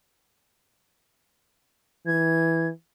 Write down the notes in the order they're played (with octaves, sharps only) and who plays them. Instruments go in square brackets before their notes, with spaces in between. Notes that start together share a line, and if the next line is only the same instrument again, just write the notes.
[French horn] E3 [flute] G#6